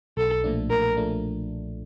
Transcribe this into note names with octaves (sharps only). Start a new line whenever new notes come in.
B1 A4
A#2 F3 A3 D4
B1 A#4
A#2 F3 A3 D4